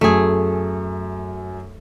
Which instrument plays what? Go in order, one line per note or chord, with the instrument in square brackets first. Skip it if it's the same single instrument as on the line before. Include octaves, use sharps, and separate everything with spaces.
[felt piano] F#2 [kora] A3 G#4